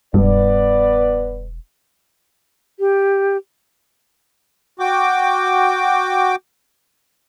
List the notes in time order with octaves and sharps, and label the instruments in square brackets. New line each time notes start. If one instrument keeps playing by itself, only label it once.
[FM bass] E1 [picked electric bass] G2 [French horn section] B3 B4 D5
[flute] G4
[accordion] F#4 G5 D6